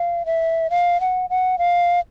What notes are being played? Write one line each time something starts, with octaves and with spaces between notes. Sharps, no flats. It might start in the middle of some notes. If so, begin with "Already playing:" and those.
Already playing: F5
E5
F5
F#5
F#5
F5